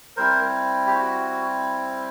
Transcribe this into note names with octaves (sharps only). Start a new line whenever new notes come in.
G3 C4 E4 A#4 C5
G4
F#4